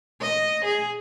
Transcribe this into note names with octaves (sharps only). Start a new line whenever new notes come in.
D#5
G#4